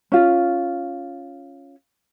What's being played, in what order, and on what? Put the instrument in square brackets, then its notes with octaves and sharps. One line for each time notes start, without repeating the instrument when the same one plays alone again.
[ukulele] C#4 F4